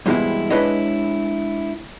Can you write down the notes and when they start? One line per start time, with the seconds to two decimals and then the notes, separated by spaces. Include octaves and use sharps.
0.06 G2 B2 E3 G#3 C4 E4
0.51 G#3 D4 E4 B4 C#5 D#5